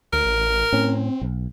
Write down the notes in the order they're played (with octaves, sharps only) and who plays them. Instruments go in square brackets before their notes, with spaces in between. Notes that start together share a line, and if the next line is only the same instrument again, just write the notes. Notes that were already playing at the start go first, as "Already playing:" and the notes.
[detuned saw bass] D2 [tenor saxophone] A#4
[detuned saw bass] A1
[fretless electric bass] A2 C#4 [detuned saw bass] C4
[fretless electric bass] B1